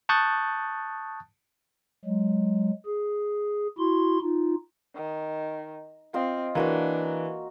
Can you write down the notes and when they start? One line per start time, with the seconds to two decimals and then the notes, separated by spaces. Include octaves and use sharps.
0.09 A5 C#6 D#6 F#6 G6 A6
2.05 F#3 G#3
2.85 G#4
3.78 E4 F#4 C6
4.22 D#4 F4
4.95 D#3
6.14 C4 F4 C5 D#5
6.55 E3 A#3 D4 F#4 A#4